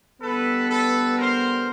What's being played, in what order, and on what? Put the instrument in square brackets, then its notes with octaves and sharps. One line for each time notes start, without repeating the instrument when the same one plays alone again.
[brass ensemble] D3 G3 B3 [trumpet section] A4 B4
[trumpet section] A4 B4
A#4 C5